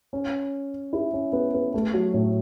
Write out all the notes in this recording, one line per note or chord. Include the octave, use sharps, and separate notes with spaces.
C#4
E4
C#4
B3
B3
A3
F#3
A2